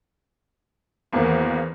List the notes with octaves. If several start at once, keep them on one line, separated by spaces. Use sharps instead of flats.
G#1 E2 A#3